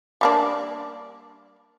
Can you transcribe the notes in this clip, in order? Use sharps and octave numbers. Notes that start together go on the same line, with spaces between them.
G3 A#3 D4